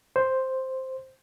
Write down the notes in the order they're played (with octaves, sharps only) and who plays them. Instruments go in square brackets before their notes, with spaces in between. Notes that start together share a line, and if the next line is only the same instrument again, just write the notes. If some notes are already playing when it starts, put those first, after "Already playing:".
[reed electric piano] C5